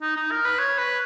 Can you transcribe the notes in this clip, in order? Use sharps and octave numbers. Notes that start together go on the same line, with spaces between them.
D#4
D#4
A#4
B4
C#5
B4